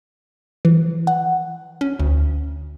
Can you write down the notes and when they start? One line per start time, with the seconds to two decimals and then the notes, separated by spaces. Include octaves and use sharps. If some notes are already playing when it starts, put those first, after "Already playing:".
0.65 E3
1.07 F#5
1.81 C#4
1.99 D2